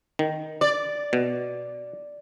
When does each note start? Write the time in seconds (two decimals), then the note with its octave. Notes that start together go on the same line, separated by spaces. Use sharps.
0.19 D#3
0.61 D5
1.13 B2